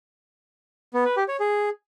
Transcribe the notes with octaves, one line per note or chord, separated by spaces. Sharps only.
B3
B4
G4
C#5
G#4